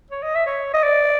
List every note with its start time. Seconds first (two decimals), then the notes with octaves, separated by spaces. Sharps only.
0.11 C#5
0.23 D#5
0.35 E5
0.46 C#5
0.74 D#5
0.84 D5